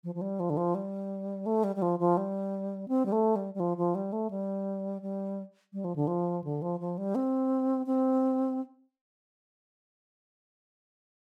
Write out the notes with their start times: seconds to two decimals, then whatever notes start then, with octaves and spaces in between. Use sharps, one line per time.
0.04 F3
0.15 F3
0.21 G3
0.40 F3
0.50 D3
0.57 F3
0.75 G3
1.46 A3
1.64 G3
1.76 G3
1.82 F3
1.99 F3
2.17 G3
2.88 C4
3.06 G3
3.12 A3
3.36 G3
3.54 G3
3.60 F3
3.77 F3
3.95 G3
4.13 A3
4.31 G3
5.02 G3
5.73 G3
5.84 F3
5.96 D3
6.07 F3
6.44 D3
6.62 F3
6.80 F3
6.98 G3
7.15 C4
7.86 C4